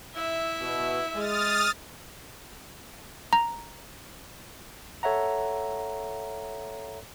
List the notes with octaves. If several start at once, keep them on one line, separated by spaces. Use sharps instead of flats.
E4 E5
B2
G#3 D#6 F6 A6
A#5
A4 C#5 E5 F#5 A#5